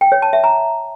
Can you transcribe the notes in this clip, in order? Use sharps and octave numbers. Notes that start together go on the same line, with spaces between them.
G5
C#5
A5
E5
A#5